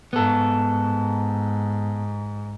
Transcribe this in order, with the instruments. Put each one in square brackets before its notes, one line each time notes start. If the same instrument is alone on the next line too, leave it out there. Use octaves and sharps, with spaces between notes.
[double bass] G#2 [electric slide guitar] B3 A4